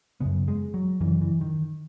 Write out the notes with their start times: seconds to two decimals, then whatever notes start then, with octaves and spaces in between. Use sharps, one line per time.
0.20 F#2 C#3 B3
0.48 G#3
0.74 F#3
1.01 F#2 E3
1.06 C#3
1.21 E3
1.41 D#3